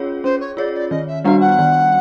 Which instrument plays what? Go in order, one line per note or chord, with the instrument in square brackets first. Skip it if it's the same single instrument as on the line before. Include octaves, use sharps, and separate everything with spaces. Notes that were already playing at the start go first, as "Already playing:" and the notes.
Already playing: [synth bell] C#4 F4 G#4 C#5
[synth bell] C#4 [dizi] C5
[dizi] C#5
[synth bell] F4 G#4 C#5 [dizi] D5
[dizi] D5
[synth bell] D#3 [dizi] D#5
[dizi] E5
[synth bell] G3 B3 D4 F#4 [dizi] F5
[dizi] F#5
[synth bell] D#3